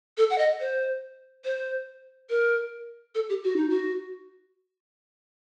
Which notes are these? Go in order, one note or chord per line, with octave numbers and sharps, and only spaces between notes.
A4
F#5
D#5
C5
C5
A#4
A4
G4
F#4
D#4
F#4